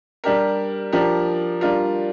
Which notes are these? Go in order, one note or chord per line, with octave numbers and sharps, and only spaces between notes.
G3 D4 G4 A#4
F3 D4 G4 A#4
G3 D4 F4 A#4